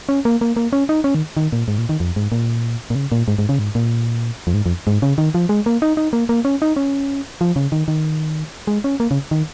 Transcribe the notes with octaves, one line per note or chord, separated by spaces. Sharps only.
C#4
A#3
A#3
A#3
C#4
D#4
C#4
D#3
D#3
A#2
G#2
A#2
D#3
F2
G#2
A#2
A#2
C#3
A#2
G#2
G#2
C#3
G#2
A#2
F2
G#2
F2
G#2
C#3
D#3
F3
G#3
A#3
D#4
D#4
A#3
A#3
C#4
D#4
C#4
F3
C#3
D#3
D#3
G#3
C#4
A#3
C#3
D#3